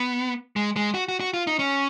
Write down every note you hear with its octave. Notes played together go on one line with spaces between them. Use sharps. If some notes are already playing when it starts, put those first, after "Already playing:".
Already playing: B3
G#3
G#3
F#4
F#4
F#4
F4
D#4
C#4